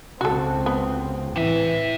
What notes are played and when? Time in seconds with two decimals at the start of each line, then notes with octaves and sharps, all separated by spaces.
0.21 C#2 C4 F#4 A4
0.66 B3
1.36 A2 C3 E3 E5